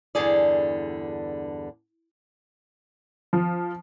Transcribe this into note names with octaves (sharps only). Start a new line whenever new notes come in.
E2 G2 D3 G#4 D5
F3